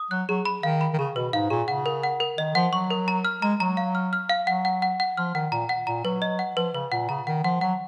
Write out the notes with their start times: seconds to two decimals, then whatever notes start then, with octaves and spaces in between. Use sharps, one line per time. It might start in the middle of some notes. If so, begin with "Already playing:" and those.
Already playing: D#6
0.11 F#3 F#6
0.29 F#3 G#4
0.45 B5
0.63 D#3 F5
0.81 B5
0.94 D#3
0.98 C#3 G#4
1.16 B2 B4
1.33 G#2 F5
1.50 A#2 G#4
1.68 C#3 F#5
1.86 A#4
2.03 F#5
2.20 A#4
2.38 D#3 D#5
2.55 F3 F#5
2.73 F#3 C#6
2.90 A#4
3.08 A#5
3.25 F6
3.42 G#3 A#5
3.60 F#3 A#5
3.77 F5
3.95 F6
4.13 F6
4.29 F5
4.47 F#3 F#5
4.65 F#5
4.82 F#5
5.00 F#5
5.17 F3 F6
5.35 D#3 F#5
5.52 A#2 A#5
5.69 F#5
5.87 A#2 A#5
6.05 F#3 B4
6.22 D#5
6.39 F#5
6.56 F3 B4
6.74 C#3 B4
6.92 A#2 F#5
7.09 C#3 A#5
7.27 D#3 F#5
7.44 F3 F#5
7.61 F#3 F#5